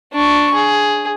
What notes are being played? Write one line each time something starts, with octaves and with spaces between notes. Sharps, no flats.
D4 C#6
G#4